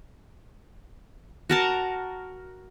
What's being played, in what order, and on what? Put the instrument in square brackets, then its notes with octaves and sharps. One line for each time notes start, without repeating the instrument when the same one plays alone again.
[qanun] F#4 A#4 A5